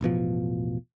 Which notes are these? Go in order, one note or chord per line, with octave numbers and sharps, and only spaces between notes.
E1 A1 B2 F3